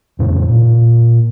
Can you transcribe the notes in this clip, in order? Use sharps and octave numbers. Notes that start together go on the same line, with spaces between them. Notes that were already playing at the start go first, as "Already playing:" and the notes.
F2 A2 C#3
A#2